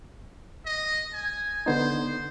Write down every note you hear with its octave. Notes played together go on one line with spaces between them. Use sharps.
D#5
G#5
D3 B3 D#4 C5